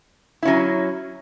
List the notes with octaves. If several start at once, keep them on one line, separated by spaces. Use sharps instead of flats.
F#3 C#4 E4